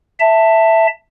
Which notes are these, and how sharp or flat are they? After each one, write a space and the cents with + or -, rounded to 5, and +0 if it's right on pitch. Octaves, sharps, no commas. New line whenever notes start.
E5 +0 A5 +15